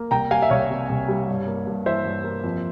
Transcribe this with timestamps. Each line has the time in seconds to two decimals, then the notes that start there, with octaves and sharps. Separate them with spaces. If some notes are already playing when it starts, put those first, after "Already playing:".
Already playing: A#3
0.11 C2 G5 A#5
0.31 G3 F5 G#5
0.42 E5
0.50 C2 C#5 F5
0.70 C3
0.89 C2
1.08 G3
1.28 G2
1.47 A#3
1.67 G2
1.86 E3 C5 E5
2.05 G2
2.24 A#3
2.44 F2